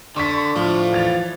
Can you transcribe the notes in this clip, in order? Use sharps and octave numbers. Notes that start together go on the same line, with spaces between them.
D3 D4 C6 C#6 B6
A2 F3
E3 A6 F7